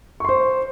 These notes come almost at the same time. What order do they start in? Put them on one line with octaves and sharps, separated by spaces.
C#6 C6 C5